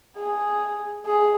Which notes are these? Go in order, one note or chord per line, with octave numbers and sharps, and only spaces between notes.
G#4
G#4